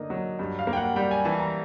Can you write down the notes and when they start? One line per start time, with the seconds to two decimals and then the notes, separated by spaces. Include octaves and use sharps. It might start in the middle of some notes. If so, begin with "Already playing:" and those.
Already playing: D3 A#3 D#4 D#5
0.10 F#3
0.39 G2
0.59 F5
0.67 A#3
0.73 G5
0.77 F#5
0.96 G3 G5
1.11 G#5
1.25 E3 A5
1.39 A#5